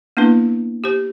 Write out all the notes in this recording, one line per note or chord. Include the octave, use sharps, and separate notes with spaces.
A#3 B3 D4 E4 B4
G4 C5